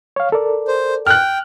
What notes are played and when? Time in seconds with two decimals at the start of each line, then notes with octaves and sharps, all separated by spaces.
0.16 C#5 F5
0.32 A4 A#4 D5
0.68 C5
1.07 G5 F6 F#6